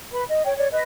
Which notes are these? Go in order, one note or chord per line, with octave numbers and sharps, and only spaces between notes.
B4 B5
D#5
C#5 G5
C#5 D5
B4 D#5